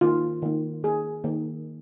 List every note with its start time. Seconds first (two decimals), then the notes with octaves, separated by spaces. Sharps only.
0.01 D#3 A#3 F4
0.42 D#3 A#3
0.83 D#3 A#3 G#4
1.24 D#3 A#3